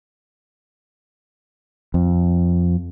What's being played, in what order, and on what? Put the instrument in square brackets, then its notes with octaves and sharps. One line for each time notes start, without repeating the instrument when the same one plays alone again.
[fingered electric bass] F2